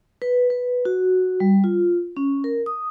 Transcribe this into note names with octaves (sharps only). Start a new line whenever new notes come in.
B4
B4
F#4
G3
F4
C#4
A#4
D#6